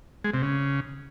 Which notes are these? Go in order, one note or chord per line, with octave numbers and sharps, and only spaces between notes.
G#3
C3
C#3